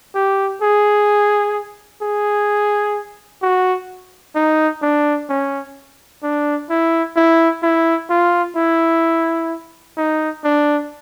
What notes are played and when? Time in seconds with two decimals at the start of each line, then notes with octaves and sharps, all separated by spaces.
0.15 G4
0.62 G#4
2.02 G#4
3.43 F#4
4.36 D#4
4.82 D4
5.30 C#4
6.23 D4
6.70 E4
7.17 E4
7.63 E4
8.10 F4
8.56 E4
9.97 D#4
10.44 D4